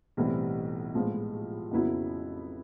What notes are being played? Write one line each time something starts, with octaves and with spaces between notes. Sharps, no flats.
B1 A2 E3 G3 C4
A#1 A2 F3 G#3 B3
F2 C#3 F#3 B3 E4